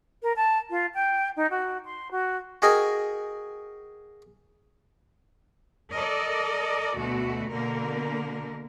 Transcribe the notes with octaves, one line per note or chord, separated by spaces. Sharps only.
A#4
A5
F4
G5
D#4
F#4
C6
F#4
F#4 G#4 A#4 D#5 G5 G#5
A4 A#4 D5 D#5
D2 B2 A3 F#4
B2 D3 A#3 A#4